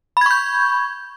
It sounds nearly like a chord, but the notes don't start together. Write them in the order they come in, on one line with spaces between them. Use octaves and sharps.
B5 G#6 C#6 G6